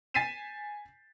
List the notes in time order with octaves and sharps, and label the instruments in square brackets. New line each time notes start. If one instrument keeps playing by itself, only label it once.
[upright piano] G#5 A6 B6 C7 D#7 E7